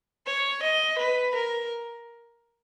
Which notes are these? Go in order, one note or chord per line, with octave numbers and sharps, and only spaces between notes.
C#5
D#5
B4
A#4